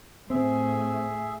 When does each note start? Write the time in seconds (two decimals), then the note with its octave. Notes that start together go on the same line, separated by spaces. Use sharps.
0.30 A2 C4 G#4 E5